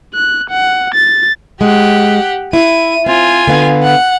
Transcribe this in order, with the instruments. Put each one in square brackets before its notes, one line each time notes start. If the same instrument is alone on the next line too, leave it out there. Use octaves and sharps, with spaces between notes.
[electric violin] F#6
F#5
A6
[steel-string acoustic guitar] G#3 [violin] G4 F#5
[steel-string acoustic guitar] E4 [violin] D#7
[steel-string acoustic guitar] C4 [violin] F4 G#5
[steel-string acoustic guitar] D3 B3 F5
[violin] F#5